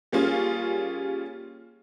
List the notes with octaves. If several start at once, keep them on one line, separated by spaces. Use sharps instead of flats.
G3 A#3 C#4 F4 G#4